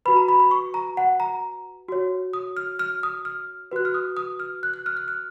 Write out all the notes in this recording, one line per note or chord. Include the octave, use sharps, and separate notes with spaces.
F#4 B4 B5
A#5
B5
B5
C#6
A#5
F#5
A#5
F#4 C#5
D#6
F6
F6
D#6
F6
F#4 B4 F#6
F6
D#6
D#6
F6
F#6
F#6
F6
F#6
F6